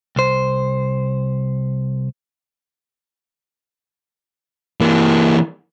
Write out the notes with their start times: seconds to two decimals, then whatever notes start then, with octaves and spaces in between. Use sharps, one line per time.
0.16 C2 C5
4.81 E3 A#3